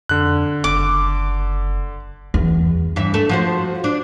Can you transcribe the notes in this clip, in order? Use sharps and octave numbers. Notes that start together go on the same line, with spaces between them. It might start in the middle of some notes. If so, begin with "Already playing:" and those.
F2 D3 F#6
F#1 D6
E2
G2 E3 E5
A3 A4
F3 F#4 C5
D4